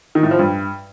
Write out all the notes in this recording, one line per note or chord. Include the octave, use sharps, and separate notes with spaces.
D#3
A2
F3
G2